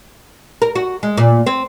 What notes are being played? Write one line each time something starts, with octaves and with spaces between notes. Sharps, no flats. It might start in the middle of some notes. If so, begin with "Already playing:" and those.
A#4
F#4
G#3
A#2
C4